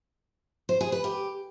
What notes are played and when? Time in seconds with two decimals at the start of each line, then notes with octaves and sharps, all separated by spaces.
0.69 C5
0.81 G#4
0.92 B4
1.04 G4